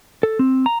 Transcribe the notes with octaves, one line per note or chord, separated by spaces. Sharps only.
A4
C4
A#5